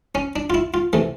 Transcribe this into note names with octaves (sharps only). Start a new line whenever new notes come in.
C#4
D4
F4
E4
F4
C3 E3 A3